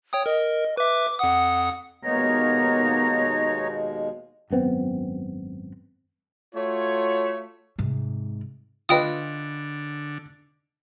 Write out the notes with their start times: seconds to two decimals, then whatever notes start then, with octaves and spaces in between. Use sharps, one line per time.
0.13 C#5 G5 D#6
0.26 A#4 D#5
0.77 B4 E5 D6
1.19 F2 F#5 D#6
2.04 D#2 B2 G#3 A#3 B3 D#4 C#5 A#5
4.50 G#1 F#2 B3 C4
6.55 A3 F4 F#4 C#5
7.79 G#2 C3
8.89 D3 F4 B4 D#5 G5 D#6